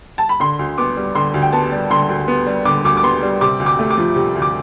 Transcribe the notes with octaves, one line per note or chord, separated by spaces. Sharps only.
A5
B5
D3 C6
D2
B3 D6
G3
D3 C6
D2
G5
B3 A5
G3
D3 C6
D2
B3
G3
D3 D6
D2 D6
D6
B3 C6
G3
C3 D6
D2
D6
A3
D6
F3
C3
D2
D6